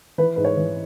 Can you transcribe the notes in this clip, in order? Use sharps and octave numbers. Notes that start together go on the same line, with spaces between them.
E3 B4
G#2 B4
C#5
E3